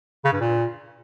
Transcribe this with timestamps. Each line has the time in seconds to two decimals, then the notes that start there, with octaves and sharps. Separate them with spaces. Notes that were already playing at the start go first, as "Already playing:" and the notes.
0.24 C#3
0.32 G2
0.40 A#2